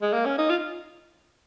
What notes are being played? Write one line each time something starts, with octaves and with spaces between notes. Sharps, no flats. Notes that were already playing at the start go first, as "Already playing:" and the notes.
G#3
A#3
C#4
D#4
F4